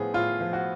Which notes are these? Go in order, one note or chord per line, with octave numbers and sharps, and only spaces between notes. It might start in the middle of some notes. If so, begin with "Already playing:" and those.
Already playing: A2 F3 B3 G#4
A2 F4
F3
F#4